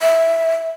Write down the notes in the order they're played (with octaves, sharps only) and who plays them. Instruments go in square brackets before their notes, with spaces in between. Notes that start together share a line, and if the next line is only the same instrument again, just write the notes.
[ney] E5